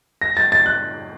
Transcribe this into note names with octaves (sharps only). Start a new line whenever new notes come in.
A#6
A6
A6
F#6